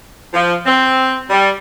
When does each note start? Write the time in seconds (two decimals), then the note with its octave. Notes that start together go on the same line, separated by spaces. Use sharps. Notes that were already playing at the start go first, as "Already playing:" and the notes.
0.34 F3
0.66 C4
1.30 G3